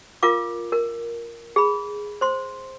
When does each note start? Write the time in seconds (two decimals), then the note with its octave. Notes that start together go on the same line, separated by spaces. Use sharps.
0.23 F4 A#4 F5 D6
0.72 A#4
1.56 G#4 B5
2.21 C5 C6